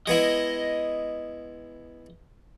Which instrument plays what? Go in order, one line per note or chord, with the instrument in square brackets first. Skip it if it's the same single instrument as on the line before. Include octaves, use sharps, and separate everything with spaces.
[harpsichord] G#3 B3 E4 [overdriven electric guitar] D#5